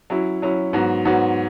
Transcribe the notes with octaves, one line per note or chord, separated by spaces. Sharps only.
F#3 C#4 E4
F#3 C#4 E4
G#2 F#3 B3 F#4
G#2 F#3 B3 F#4